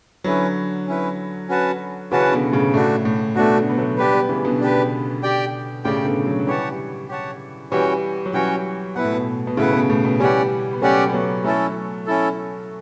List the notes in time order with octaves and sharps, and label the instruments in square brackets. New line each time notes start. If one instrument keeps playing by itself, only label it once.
[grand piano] D3 F#3 [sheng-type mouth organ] C#4 E4 B4
[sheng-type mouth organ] C#4 E4 B4
C#4 F#4 B4 F#5 A5
[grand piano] C#3 E3 [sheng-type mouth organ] C#4 F#4 B4 F#5 A5
[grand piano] B2 D3
A2 C#3
[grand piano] A2 [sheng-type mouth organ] A3 D4 F#4
[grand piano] A2
[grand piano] B2 [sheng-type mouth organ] A3 D4 F#4
[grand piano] B2 D3
B3
F#3 A3
[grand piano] G3 B3 [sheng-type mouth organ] D4 G4 B4
[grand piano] G3 B3
C#3 E3
B2 D3
[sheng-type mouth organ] D4 G4 B4
G4 D5 G5
[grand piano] A2 C#3 [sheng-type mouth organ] G4 D5 G5
[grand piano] B2 D3
D3 F#3
F#3
[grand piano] E3 G3 [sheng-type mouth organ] G4 C#5 F#5 A5
[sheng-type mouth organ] G4 C#5 F#5 A5
[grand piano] E3 G3 [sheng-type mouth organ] C#4 F#4 C#5 G5
[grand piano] F#3
[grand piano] E3 G3 [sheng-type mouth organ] C#4 F#4 C#5 G5
[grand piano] B2 [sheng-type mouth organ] E4 B4 F#5
[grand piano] A2
B2
B2
[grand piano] A2 C#3 [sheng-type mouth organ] E4 B4 F#5
[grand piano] B2
A2
B2
[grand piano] E3 G3 [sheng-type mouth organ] C#4 G4 D5 F#5
[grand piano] B3
[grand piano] F#3 A3 [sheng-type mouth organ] C#4 G4 D5 F#5
[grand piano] B3
F#3 A3
[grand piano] F#3 A3 [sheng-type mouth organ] C#4 E4 A4
[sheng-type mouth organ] C#4 E4 A4